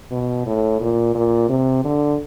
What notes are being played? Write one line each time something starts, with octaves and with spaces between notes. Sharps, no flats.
B2
A2
A#2
A#2
C3
D3